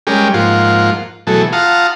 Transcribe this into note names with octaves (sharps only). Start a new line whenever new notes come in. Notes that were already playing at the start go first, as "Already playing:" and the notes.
G3 G#3 C#4 G4 A#4
G#2 F3 A#3 F4 F#5
B2 E3 F#3 A3 G#4 A4
F4 F5 F#5 A5 A#5 D#6